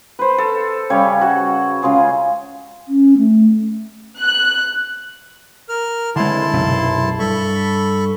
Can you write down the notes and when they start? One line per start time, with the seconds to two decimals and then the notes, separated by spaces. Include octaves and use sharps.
0.19 B4 C5
0.38 A4
0.90 C#3 G3 C#5
1.21 F#4
1.82 C#3 G#3 F4 G#4
2.88 C#4
3.18 A3
4.19 F#6
5.69 A#4 F6
6.16 D3 G#3 E4 A5 C6
6.53 B1 F#2 C3
7.19 G2 A4 B5 C#6